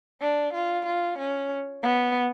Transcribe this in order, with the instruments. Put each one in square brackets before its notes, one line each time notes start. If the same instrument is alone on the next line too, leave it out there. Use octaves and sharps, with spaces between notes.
[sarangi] D4
F4
F4
C#4
B3